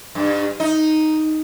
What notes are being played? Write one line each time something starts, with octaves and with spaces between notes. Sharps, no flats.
G2
D#4